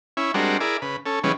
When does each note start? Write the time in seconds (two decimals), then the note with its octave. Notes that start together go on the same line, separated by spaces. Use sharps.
0.17 C#4 E4
0.34 G3 G#3 C4 D4 F#4 A#4
0.60 E4 G#4 A#4 D5
0.82 C#3 B4
1.06 C#4 A4
1.24 C#3 E3 G3 G#3 B3 C#4